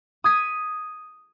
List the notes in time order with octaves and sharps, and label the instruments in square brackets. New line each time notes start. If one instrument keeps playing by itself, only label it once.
[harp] D#6 G#6 B6 D#7